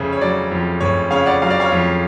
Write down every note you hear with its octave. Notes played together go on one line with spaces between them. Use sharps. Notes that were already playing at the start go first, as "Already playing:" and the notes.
Already playing: F1 C#3 C#5
C#5
F#3 D5
F2
F1 C#5
C#3 C#5 F5
D5 F#5
F#3 F5
D5
C#5 F5
F2